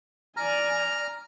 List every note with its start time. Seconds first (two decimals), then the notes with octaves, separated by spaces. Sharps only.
0.37 D5 G#5 A#5 F6